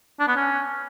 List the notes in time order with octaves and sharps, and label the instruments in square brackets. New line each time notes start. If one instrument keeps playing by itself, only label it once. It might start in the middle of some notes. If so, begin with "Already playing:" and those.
[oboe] D4
B3
C#4